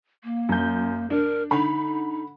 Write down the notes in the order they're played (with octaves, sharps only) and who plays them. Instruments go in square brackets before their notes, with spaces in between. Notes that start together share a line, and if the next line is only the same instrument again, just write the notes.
[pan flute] A#3
[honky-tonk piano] F#2 G6
[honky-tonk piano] D4 [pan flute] A#4
[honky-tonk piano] D3 B5 [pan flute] D#4